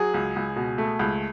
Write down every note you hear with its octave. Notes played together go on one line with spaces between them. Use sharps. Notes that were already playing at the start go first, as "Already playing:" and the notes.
Already playing: F#3 G#4
C#2
C#2
B2
A3
C#2